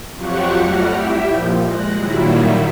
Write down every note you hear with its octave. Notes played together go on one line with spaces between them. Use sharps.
F2 F3 F#3 G4 F#5 C#6
F2 G3 A3 F#5 F6 A#6
E4 G4 E5 G5
A#2 F3
G#3 F#6 A#6
A#2 D#3 F#3 G3 E4